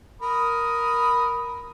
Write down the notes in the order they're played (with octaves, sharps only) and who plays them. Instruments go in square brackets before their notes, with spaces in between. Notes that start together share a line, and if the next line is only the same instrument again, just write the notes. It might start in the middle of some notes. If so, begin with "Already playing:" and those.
[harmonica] A#4 B5 D#6